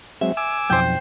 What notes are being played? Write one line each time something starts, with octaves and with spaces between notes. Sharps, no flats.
F#3 G#3 C4 E5
G#5 D6 E6
B1 F2 C5 G5